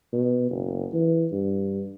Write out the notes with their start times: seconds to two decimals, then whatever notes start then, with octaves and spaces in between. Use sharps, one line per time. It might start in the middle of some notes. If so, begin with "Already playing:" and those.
0.12 B2
0.50 F#1
0.93 E3
1.32 G2